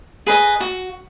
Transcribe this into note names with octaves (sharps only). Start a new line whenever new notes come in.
G#4 B4 D#5
F#4